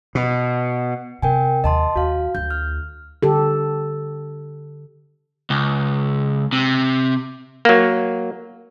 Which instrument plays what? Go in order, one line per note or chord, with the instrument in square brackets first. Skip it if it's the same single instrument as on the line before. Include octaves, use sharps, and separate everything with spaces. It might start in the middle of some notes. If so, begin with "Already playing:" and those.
[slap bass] B2
[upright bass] C3 [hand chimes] A#4 G5 G#5
[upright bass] D#2 [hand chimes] D#5 A5 C6
[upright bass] D#2 [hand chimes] F#4 F5
[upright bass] D2 [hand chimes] G6
[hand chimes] F6
[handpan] D3 G4 A4
[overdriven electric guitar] C#2
C3
[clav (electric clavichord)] F#3 A#3